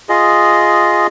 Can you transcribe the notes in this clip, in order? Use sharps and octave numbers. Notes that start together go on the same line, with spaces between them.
F4 G#4 D#5